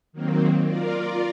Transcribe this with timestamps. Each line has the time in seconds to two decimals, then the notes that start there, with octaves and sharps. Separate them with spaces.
0.13 D#3 F#3 A#3 C4
0.65 F4 A#4 D5